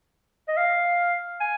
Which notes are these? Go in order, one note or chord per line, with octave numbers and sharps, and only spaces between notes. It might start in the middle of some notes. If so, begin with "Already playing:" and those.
D#5
F5
G#5